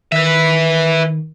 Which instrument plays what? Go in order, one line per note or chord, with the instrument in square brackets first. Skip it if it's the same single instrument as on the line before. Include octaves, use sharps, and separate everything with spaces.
[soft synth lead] D#3 [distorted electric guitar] B4 E5